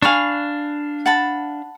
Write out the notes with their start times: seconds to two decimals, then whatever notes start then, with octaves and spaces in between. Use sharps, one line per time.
0.02 D4 F5 G#5 B5 C#6
1.06 F#5 A5 B5